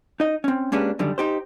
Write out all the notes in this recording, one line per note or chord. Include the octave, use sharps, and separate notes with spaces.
D#4 D#5
C4 C#4
G#3 A#3 C#4 D4 G4 B4
F#2 D3 D#3 G3
D#4 G4 C5